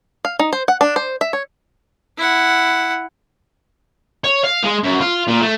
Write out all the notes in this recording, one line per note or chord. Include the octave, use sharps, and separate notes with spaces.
F5
D#4
C5
F#5
D4
C5
E5
C#5
E4 F#5
C#5
F5
G#3
F#2
F4
A#2
A3